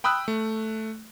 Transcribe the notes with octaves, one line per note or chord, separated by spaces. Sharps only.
G5 B5 D#6 E6 F#6
A3